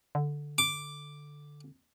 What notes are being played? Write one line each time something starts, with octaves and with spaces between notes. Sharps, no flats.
D3
D6